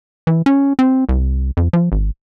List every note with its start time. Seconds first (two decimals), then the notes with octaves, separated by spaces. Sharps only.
0.27 E3
0.46 C#4
0.79 C4
1.09 C2
1.57 F2
1.73 F3
1.92 G#1